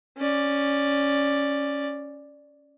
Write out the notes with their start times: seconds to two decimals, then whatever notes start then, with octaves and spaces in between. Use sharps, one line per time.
0.18 C#4 D5